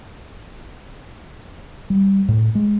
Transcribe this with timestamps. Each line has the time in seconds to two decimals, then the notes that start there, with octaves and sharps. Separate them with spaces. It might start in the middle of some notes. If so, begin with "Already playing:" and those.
1.90 G3
2.28 A2
2.55 G#3